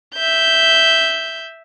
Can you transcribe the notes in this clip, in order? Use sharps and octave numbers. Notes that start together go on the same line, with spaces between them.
E5 G6